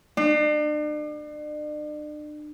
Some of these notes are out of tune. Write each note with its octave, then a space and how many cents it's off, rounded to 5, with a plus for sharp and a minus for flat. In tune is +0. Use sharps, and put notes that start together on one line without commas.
D4 +40